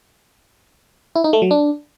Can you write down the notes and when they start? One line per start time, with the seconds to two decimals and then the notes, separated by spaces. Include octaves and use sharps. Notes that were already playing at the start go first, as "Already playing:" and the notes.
1.15 E4
1.24 D#4
1.33 A3
1.42 F#3
1.51 D4